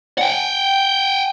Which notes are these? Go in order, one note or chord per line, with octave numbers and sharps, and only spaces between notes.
F#5 G5